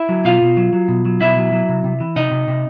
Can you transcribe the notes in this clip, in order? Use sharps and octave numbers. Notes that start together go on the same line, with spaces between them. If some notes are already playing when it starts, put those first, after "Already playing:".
Already playing: E4 E5
F#3
B2 F4 F5
B2
F#3
F#3
B2
F#3
B2 E4 E5
F#3
F#3
C3
C3
E3
C3 D#4 D#5
C3
C3